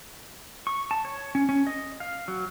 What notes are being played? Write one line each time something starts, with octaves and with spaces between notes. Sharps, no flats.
C#6
A5
C#5
C#4
C#4
D#5
F5
F#3